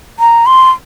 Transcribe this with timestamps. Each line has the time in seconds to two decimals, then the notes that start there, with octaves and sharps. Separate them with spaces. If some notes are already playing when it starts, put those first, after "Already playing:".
0.19 A#5
0.46 C6